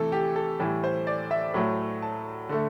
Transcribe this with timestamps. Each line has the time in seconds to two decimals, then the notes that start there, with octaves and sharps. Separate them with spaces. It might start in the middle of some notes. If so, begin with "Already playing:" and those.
Already playing: C3 E3 A3 A4
0.12 G4
0.36 A4
0.60 A2 E3 G3
0.84 C5
1.07 D5
1.31 E5
1.54 A2 F#3 A3
2.02 A5
2.49 D3 A3